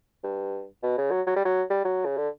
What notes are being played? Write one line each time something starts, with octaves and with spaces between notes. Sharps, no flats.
G2
B2
C#3
F#3
F#3
G3
F#3
G3
F#3
C#3
D3